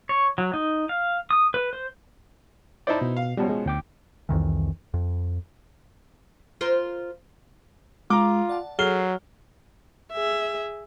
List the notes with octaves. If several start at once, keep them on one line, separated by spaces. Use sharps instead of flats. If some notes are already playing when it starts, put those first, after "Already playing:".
C#5
F#3
D#4
F5
D#6
B4
C5
D#4 E4 C5 D5 A5
B2
F5
B2 F3 G3 C#4
G#3
D2 G5 D6
C2 F2 D#3 E3
F2
F4 A#4 C5
G#3 F4 A#5 D6
D5 F#5 A5
F#3 G#4 A4 F6 C7 G7
G#4 E5